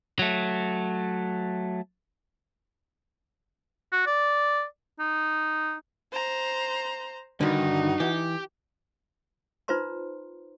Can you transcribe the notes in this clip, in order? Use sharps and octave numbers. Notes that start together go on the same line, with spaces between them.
F#3 A3
F#4
D5
D#4
C5 A#5
G2 D3 D#3 D#4 F#4
E3 G4
D#4 F4 B4 C5 A#5 C6